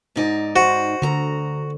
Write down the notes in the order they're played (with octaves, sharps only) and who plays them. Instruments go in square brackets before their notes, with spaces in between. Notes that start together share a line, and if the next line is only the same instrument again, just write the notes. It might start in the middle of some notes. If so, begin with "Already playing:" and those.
[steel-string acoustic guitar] G#2 D#4 D5
[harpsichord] F#4 [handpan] C5
[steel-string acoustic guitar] D2 A#5 [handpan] D3